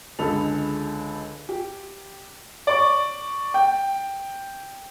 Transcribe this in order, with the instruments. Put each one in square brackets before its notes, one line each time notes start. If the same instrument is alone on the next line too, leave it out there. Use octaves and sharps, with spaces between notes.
[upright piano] C#2 D3 G#3 A4 B5 F7
G4
D5 C#6
G5